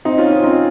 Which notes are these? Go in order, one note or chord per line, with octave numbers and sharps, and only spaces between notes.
C4 D#4
C#4 F4
C#4 F4
C4 D#4